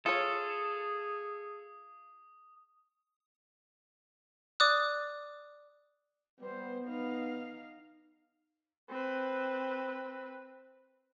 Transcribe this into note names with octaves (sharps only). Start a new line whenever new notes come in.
F4 G#4 A4 C#5 D#6
D5 D6 D#6 F#6
G3 B3 C5
D#4 F5
C4 B4